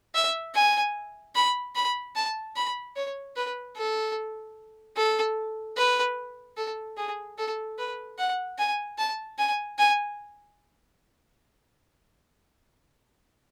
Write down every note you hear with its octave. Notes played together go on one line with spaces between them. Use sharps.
E5
G#5
B5
B5
A5
B5
C#5
B4
A4
A4
B4
A4
G#4
A4
B4
F#5
G#5
A5
G#5
G#5